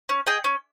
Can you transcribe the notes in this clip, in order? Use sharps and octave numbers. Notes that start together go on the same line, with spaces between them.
C#4
G#4 D#5 G5
C#4